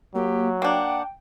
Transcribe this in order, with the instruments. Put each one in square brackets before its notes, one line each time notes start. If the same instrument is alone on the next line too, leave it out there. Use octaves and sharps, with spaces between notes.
[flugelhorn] F#3 [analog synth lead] A#3 [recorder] G4
[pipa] A#3 D4 [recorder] F#5 [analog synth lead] G5